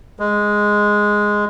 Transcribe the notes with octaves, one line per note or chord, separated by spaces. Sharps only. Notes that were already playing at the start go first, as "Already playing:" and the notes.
G#3